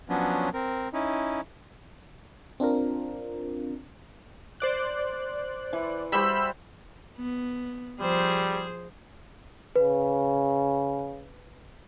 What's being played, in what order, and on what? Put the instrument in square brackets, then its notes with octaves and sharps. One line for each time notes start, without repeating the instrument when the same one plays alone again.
[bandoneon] F3 F#3 B3 C#4 D4
C4 A#4
C#4 D#4 E4
[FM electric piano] C4 D4 F4 A#4
[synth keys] C5 D5 F#6
[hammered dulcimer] E3
[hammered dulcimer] G3 F#4 C5 [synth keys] B5 E6 G6
[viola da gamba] B3
[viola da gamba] F3 G#4 C5 [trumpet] G3
[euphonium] C#3 [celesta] B4